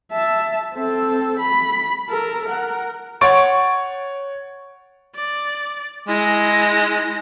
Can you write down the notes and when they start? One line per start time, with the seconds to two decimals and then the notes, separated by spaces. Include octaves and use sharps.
0.12 E5 A5
0.74 C4 A4
1.39 B5
2.09 A4 A#4
2.45 A#4 F#5
3.21 C#5 F#5 C#6 A6 D7
5.15 D5
6.08 G#3 E4 A#6